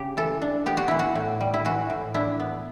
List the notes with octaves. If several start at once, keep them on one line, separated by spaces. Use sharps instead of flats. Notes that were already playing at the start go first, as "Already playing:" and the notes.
Already playing: C#3 G4
E3 A4
D4
B3 G4
F#4
E3 E4
F#4
A2
G3
E4
E3 F#4
A2
D4 E4
B3